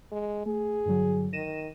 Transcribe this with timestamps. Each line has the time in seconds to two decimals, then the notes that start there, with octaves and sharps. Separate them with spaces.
0.11 G#3
0.46 A3 G#4
0.86 G2 D3 F#3
1.33 D#3 A#6 D#7 E7